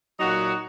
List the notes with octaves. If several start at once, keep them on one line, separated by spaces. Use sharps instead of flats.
A#2 F#3 D#4 F#4